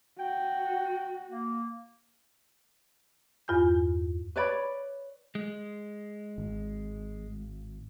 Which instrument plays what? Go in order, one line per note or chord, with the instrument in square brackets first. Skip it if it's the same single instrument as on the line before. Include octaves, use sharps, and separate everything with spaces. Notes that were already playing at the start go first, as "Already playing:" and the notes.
[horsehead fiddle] F#4 [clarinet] G5
[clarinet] A#3
[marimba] E2 G2 F4 G#5 G6
[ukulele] B4 C#5 D5 B5
[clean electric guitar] G#3
[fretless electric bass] G#1